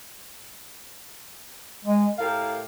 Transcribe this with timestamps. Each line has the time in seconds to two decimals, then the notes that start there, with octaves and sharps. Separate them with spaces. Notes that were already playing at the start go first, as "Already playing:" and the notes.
1.85 G#3
2.19 A2 G4 A#4 F5